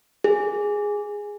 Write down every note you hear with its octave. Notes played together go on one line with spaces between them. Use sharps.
G#4